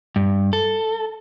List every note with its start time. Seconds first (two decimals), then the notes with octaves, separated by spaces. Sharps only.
0.16 G2
0.53 A4